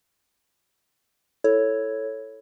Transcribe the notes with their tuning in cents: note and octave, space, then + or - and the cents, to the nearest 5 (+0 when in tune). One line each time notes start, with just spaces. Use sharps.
E4 +0 A4 +0 C#5 +0